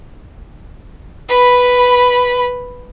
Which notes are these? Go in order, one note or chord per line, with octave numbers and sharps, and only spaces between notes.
B4 B5